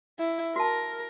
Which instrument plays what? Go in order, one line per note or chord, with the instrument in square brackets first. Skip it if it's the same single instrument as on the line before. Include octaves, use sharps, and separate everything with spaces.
[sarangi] E4
[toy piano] F#4 A5 [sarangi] A#4